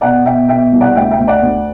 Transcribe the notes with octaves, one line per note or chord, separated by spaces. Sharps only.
B2 D5 F#5
B2 E5 G5
B2 E5 G5
C2
D5 F#5
D2 E5 G5
E5 G5
D2
D5 F#5
D2